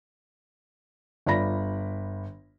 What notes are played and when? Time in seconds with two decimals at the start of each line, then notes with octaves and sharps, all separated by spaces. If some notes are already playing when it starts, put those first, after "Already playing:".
1.26 G1 F4 D5 B5 A#6